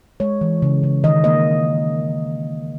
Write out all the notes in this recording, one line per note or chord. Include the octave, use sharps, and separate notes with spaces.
G#3 C#5
E3
C#3
C#3
D#3 D#5
A#3 D#5